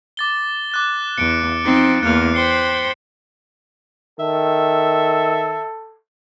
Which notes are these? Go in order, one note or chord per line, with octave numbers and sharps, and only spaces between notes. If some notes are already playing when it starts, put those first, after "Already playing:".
D6 A6 G7
D6 F#6 A6
E2 C#7 D7
F3 C4 D#4
E2 A#3 F6 F#6 C#7
C5 G5 B5 C7 C#7 G7
D#3 A4 E5